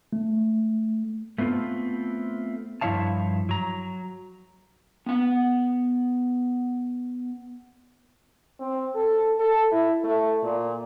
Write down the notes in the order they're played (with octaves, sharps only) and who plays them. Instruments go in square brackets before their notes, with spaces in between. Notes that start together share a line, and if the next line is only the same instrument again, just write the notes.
[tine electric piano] A3
[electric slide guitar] A3 B3 C4 F4 A4
G2 F3 E4 C#5 F5 A5
F#3 A#5
B3 F#5
[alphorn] C4
A4
A4
E4
A3
A#2